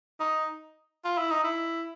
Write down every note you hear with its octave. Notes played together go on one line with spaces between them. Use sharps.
D#4
F4
E4
D#4
E4